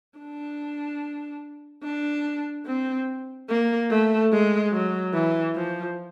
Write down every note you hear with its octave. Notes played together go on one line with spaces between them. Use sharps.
D4
D4
C4
A#3
A3
G#3
F#3
E3
F3